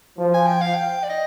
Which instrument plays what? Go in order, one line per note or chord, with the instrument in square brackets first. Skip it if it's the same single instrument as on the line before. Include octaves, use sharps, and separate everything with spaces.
[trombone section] F3
[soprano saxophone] G#5
G5
F5
G5
D5
D#5